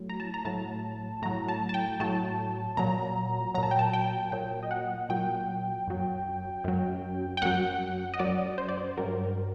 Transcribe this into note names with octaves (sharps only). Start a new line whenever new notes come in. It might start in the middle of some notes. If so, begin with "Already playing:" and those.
Already playing: A2 F#3
A#5
A5
A#5
A2 F#3 A5
A2 F#3 A#5
A5
A5
G5
A2 F#3 A5
A#2 F#3 A#5
A#2 F#3 A#5
A5
G5
A5
G5
A#2 F#3 G5
D#5
F#5
A#2 F#3 G5
F#2 F#3
F#2 F#3
G5
F#2 F#3 F#5
D#5
F#2 F#3 D5
C5
D5
C5
G2 F#3 A#4